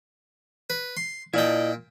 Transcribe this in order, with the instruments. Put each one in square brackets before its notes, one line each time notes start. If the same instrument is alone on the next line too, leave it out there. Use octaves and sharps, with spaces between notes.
[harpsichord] B4
C6
[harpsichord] A#2 G5 [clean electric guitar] E4 D5 D#5